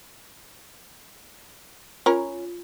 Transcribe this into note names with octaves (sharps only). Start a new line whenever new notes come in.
C#4 F4 A#4